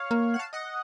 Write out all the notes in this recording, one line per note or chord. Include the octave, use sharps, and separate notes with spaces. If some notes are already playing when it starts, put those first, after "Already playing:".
Already playing: C#5 F5
A#3
F#5
F5 A5
D#5 F#5